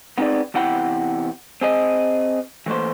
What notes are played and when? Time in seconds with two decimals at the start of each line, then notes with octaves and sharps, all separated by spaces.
0.18 B3 C4 D#4 G4 G#4 D5
0.54 E2 C3 E4 F#5 G5 B5
1.61 C4 G#4 D#5
2.66 E3 A3 A#3 C5